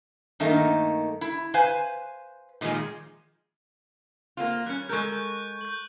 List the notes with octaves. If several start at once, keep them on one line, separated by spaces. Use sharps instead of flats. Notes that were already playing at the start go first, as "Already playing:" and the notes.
G2 D#3 A3 A#3 D#4
E4
B4 C5 F5 G#5
A#2 D#3 F3 F#3 G#3
A#3 C4 F4
G3 C#4 F#6
G#3 A4 A#4 C#6 F#6 G6
G6
G6 F#7